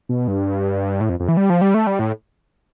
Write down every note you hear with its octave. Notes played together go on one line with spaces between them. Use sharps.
B2
G2
A2
F2
F2
E3
G3
F3
G3
A3
G3
A2